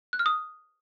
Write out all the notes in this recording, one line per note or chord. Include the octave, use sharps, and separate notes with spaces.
F#6
F6
D#6